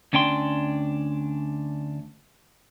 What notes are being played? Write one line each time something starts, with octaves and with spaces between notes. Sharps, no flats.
D2 C#4 D4 G5 C6